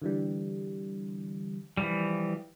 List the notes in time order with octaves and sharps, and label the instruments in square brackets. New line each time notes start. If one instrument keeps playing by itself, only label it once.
[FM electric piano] D3 E3 G3
[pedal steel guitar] E3 F3 G3